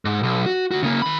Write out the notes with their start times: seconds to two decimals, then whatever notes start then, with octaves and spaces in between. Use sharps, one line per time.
0.05 G#2
0.23 B1
0.46 F#4
0.71 D2 F#4
0.83 C#3 A#3
1.02 D#3 B5